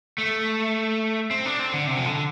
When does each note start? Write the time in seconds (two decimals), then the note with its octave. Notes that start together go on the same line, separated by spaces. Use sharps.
0.18 A3
1.31 C4
1.46 D4
1.60 C4
1.73 D3
1.87 C3
1.97 F3
2.06 D3